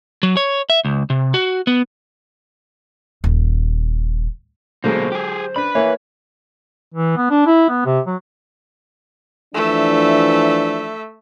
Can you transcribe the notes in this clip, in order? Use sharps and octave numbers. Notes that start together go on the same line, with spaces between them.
F#3
C#5
E5
C#2
C3
F#4
B3
D#1
B2 D3 F#3 G#3 A#3 C5
G4 G#4
D4 B4 B5
E3 A#3 C#5
E3
B3
D4
E4
B3
C3
F#3
E3 F3 A3 D4 E5